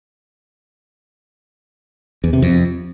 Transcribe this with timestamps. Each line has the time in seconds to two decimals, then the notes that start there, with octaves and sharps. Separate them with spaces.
2.24 E2
2.33 C3
2.42 F2